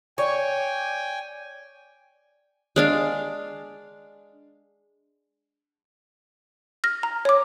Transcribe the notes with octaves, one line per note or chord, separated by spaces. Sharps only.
C#5 D5 G5 G#5
G#3 D4 F5
F6 A#6
A#5
C#5 D6